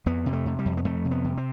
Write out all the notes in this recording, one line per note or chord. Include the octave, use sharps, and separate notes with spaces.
F2 B3
C3
A3
C3
G3
F2
B3
F2 A3
C3
B3
C3
C4